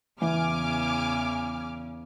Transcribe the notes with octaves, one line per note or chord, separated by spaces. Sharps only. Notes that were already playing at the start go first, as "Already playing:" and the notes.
E2 C#3 E3 G#5 D6 F6